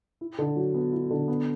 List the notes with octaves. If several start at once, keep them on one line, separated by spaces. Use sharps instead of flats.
E4
D3
F#3
B3
E4
D3
B3